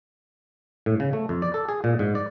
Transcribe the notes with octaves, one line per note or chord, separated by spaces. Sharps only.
A2
C#3
A3
F2
D5
A4
G#4
A#2
G#2
D5